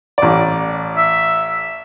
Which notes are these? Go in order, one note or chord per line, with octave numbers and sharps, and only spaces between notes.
A1 D5
E5